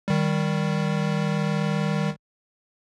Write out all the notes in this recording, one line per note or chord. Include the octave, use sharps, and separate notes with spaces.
D#3 G3